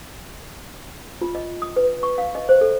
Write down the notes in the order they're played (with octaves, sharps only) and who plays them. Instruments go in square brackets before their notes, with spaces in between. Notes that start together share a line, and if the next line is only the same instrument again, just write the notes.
[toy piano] F4
D#5
D#6
B4
C#6
F5
D#5
C5
A4